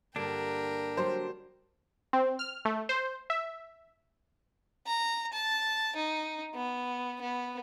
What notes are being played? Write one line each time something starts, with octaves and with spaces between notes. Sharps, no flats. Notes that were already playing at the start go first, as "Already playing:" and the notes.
G2 D3 A#3 D4 A#4 G5
F#3 G3 G4 C5
C4
F6
A3
C5
E5
A#5
A5
D#4
B3
B3